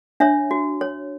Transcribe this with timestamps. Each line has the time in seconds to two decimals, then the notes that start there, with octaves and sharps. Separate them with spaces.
0.20 D4 C#5 E5
0.51 F#4
0.81 C#5